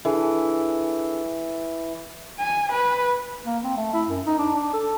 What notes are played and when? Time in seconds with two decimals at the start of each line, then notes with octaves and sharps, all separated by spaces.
0.05 E3 D4 G#4 A4
2.39 G#5
2.72 B4
3.46 A#3
3.63 C4
3.77 A3
3.93 E4
4.08 F#2
4.26 D#4
4.38 D4
4.56 D4
4.74 A4